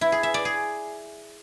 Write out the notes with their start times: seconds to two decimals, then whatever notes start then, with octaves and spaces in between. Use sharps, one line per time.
0.01 E4
0.12 G#4
0.23 E5
0.34 D5
0.45 G#4